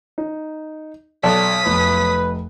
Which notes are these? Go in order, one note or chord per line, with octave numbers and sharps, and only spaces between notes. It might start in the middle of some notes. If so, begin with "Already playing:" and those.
D#4
B1 A4 D5 G5 A5 D#6 F#6 B6
F1 B4